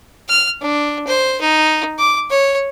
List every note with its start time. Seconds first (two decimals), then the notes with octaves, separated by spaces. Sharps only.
0.29 F6
0.61 D4
1.07 C5
1.41 D#4
1.99 D6
2.30 C#5